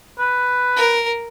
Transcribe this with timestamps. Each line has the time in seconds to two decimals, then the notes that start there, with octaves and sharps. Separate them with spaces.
0.19 B4
0.77 A#4